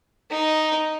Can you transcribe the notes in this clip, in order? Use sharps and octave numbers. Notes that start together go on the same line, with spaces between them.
D#4